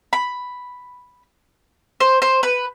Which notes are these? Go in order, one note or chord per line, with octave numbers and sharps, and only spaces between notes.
B5
C5
C5
B4